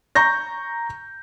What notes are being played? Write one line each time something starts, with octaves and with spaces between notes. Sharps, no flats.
A#5 C#6 G6 A#6